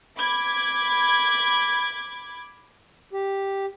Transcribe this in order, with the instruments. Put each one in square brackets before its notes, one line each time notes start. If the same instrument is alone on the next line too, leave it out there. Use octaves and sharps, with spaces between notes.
[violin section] B5 D6 G#6
[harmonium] G4